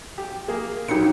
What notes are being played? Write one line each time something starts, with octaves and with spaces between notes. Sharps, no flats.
G4
A#3 G#4
A#1 F#3 D#4 G4 C#7